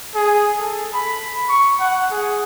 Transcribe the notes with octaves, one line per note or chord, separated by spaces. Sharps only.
G#4
A4
B5
C#6
F#5
G#4